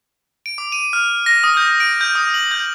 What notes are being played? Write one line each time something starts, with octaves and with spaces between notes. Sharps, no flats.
D7
D6
D#7
F6
A#6
D#6
G6
D7
G6
D#6
F#7
G6